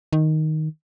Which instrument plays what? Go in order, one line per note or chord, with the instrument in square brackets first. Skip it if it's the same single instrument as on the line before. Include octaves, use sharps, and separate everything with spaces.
[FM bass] D#3